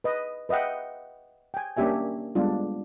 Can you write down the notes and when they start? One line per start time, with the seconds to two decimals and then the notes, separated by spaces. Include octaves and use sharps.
0.04 B4 D#5
0.49 B4 D#5 E5 F#5 G5
1.54 G5 G#5
1.77 A#3 C#4 D4 G4 E5 G#5
2.35 G3 G#3 B3 D4 F4